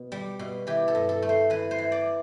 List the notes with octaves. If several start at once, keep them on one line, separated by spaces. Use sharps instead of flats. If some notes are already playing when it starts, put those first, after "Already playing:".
Already playing: B2
G3
B2
E3 G4
A4
G2
A4
A3
C5
E3 B4
C5
E3
D5